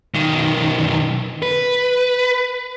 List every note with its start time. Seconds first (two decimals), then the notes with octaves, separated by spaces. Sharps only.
0.14 B1 D#3
1.42 B4